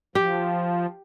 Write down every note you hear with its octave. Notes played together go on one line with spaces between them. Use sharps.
F3 G4